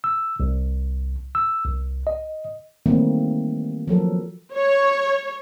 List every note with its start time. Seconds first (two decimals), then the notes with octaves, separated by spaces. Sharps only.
0.04 E6
0.40 C2
1.35 E6
1.65 C2
2.07 D#5
2.86 D#3 E3 G3 A3 A#3 C4
3.88 F3 F#3 A4 A#4
4.55 C#5